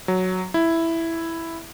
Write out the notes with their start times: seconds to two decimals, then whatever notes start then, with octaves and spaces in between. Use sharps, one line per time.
0.08 F#3
0.54 E4